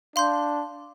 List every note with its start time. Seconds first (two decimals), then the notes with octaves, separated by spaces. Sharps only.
0.16 D4 F5 C6 G6